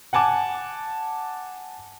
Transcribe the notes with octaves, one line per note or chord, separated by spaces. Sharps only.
F#5 G#5 A5 D6